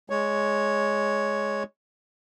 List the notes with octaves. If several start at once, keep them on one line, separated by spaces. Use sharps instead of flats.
G#3 C#5